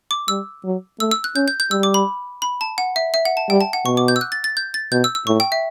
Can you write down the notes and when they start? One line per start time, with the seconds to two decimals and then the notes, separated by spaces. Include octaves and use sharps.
0.11 D6
0.28 G3 E6
0.64 F#3
1.00 A3 E6
1.11 E6
1.24 F#6
1.36 C#4 G6
1.48 G6
1.60 G6
1.71 G3 E6
1.83 D6
1.94 B5
2.42 B5
2.61 A5
2.78 F#5
2.96 E5
3.14 E5
3.25 F#5
3.37 A5
3.49 G3 G5
3.61 A5
3.73 F#5
3.85 B2 C#6
3.97 D6
4.08 G6
4.16 E6
4.21 F#6
4.32 A6
4.44 A6
4.57 G6
4.74 A6
4.92 B2 G6
5.04 E6
5.15 E6
5.27 A2 C#6
5.40 G5
5.52 E5